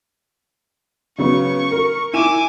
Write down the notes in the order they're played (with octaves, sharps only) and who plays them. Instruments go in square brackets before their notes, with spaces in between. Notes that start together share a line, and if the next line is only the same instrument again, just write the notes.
[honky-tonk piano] C#3 F#3 B3 [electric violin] C#6
[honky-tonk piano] A#4
[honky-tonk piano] E4 D#7 E7 [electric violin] G#5 D6